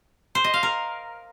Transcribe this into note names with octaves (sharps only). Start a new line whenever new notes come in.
C5
D#5
F5
A#4